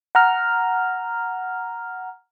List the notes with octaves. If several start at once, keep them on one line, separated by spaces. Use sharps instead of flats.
F#5 A#5 F6